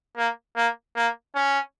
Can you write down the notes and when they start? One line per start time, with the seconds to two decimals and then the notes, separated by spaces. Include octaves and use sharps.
0.17 A#3
0.56 A#3
0.96 A#3
1.35 C#4